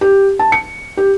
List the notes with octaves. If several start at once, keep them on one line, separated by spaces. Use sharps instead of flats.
G4
A5
C#7
G4